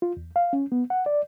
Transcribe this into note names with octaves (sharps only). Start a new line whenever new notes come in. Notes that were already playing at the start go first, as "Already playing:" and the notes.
F4
E2
F5
C#4
B3
F#5
D5